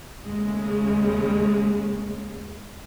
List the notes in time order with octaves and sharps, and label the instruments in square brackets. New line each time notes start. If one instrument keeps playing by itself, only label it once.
[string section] D#2 C#3 G#3 A3